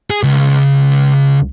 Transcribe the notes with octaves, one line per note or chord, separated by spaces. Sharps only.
G#4
C#2